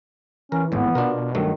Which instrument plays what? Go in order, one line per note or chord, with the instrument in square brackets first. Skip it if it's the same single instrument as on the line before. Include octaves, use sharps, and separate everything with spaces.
[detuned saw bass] E3 [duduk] C#4 [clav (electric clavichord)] A#4
[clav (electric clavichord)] G#1 E2 A2 [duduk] B3
[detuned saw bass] B2 [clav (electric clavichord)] D4 F4 A#4
[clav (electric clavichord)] G2 F#3 A3 [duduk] D#3